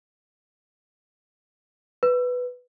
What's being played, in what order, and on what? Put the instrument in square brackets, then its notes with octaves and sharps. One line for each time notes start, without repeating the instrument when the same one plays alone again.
[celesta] B4